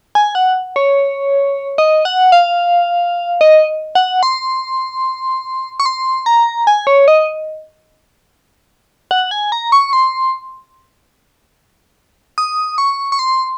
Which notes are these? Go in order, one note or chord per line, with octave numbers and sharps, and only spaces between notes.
G#5
F#5
C#5
D#5
F#5
F5
D#5
F#5
C6
C#6
C6
A#5
G#5
C#5
D#5
F#5
G#5
A#5
C#6
C6
D#6
C#6
C#6
C6